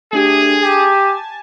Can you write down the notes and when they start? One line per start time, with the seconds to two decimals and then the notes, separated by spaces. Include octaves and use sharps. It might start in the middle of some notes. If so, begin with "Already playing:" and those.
0.13 A3 D4 G4 G#4
0.62 G4 G#5 A5